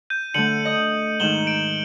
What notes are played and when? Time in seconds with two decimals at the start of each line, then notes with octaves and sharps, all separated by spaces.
0.10 G6 D#7
0.34 D3 A3 C#7 D#7 F#7
0.65 D#5
1.20 G#2 D#3 E7 F#7 G7
1.47 D7